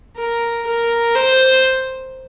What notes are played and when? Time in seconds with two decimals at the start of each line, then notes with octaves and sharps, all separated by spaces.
0.17 A#4
0.67 A#4
1.15 C5